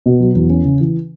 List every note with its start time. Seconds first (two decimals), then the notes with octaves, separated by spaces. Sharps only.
0.06 B2
0.20 F#3
0.35 E2
0.50 C#4
0.65 C#3
0.80 E3